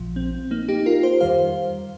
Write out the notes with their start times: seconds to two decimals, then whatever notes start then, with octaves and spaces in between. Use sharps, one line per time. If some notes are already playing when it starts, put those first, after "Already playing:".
Already playing: A#1 A#2 F3
0.16 C4
0.51 A#3 D#4
0.69 D#4 G4
0.86 F4 A#4
1.03 G4 C5
1.20 F2 D#3 G3 C5 F5